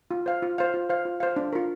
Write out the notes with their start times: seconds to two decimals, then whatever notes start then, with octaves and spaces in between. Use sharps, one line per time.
0.11 F4
0.26 C5 F5
0.42 F4
0.58 C5 F5
0.74 F4
0.89 C5 F5
1.05 F4
1.20 C5 F5
1.36 D4
1.53 F4 A#4